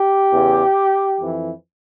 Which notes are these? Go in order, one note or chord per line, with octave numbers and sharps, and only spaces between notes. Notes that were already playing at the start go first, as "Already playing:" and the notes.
Already playing: G4
E2 C#3 E3
F2 E3